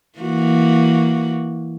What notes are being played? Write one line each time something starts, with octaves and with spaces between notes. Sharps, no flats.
E3 A#3 F#4